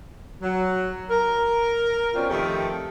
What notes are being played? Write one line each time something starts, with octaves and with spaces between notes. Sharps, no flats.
F#3
A#4
B2 C4 C#4 F4 D5
F2 D#3 A3 G4 A4